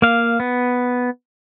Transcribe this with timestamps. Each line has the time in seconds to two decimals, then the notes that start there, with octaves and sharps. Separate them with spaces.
0.02 A#3 F5
0.40 B3